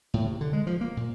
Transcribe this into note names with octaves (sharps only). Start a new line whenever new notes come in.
A2
C3
D3
G#3
F3
A#3
A#2